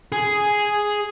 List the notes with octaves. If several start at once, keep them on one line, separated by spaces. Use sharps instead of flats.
G#4